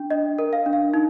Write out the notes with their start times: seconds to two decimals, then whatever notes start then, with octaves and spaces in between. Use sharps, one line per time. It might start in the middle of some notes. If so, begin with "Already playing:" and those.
Already playing: D4 G5
0.10 D4 D#5
0.39 A#4
0.53 F5
0.66 D4
0.73 F5
0.94 D#4